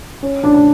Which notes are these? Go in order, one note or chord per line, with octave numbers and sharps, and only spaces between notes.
C#4
D4
D4